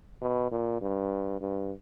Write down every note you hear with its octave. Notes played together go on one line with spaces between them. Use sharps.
B2
A#2
G2
G2